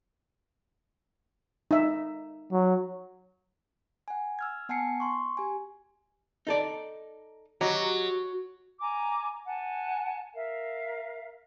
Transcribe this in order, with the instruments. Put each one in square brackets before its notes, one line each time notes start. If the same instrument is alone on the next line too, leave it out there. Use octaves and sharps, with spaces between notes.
[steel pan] D#4 E5
[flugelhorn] F#3
[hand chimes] F#5 G#5
E6 F6 G#6
B3 F#5 G#5 A5 C7 C#7
C6 C#6
G4 G#5
[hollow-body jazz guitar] D#4 A4 D5
[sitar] F#3 [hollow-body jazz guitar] G4 D#5 A#5
[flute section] G#5 A#5 D6
F#5 G#5 A5
A#4 E5 F5